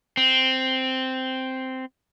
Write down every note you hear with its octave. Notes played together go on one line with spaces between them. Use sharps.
C4